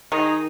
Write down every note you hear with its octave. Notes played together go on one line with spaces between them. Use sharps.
D#3 D#4 G#4